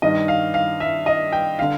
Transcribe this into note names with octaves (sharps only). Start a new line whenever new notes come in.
G2 D#3 D#5
F5
F5
E5
D#5
G5
D3 F5